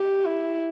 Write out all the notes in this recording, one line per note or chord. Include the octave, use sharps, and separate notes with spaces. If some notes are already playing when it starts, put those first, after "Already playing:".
Already playing: G4
E4